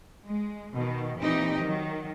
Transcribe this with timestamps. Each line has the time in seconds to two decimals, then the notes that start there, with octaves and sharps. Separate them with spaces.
0.24 G#3
0.73 B2 D#3
1.17 A#2 E3 C4 D#4 G4
1.62 D#3 F#3